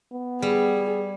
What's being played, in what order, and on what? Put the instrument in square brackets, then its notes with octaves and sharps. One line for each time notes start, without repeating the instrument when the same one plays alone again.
[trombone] B3
[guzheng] G3 [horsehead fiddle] G#4